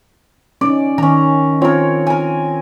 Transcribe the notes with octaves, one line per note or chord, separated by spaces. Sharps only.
C#4 D#4 D5
D#3 C#4 A#5
C4 F4 A#4 C#5
A#4 G#5